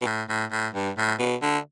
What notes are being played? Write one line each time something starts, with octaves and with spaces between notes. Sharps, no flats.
B2
A2
A2
A2
G2
A2
B2
D3